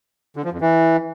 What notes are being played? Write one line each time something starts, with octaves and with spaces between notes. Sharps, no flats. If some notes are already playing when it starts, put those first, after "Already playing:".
D3
F3
F2
E3